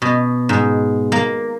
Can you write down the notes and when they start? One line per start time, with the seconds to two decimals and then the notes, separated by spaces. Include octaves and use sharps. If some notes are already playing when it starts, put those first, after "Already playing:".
0.02 B2
0.49 G#2
1.12 A#3